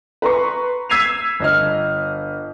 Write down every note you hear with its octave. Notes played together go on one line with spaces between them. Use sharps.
B4 A#5 C6 C#6
E6 G#6 B6 C7 D#7 F7
G1 D#5 F6